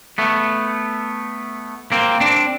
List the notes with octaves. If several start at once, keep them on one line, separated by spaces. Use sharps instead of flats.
A3 B3
A#3 C4
C4 D4